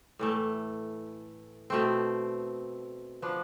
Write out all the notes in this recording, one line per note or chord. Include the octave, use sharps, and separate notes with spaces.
A2 E3 A3
B2 A3 C4
F3 B3 D4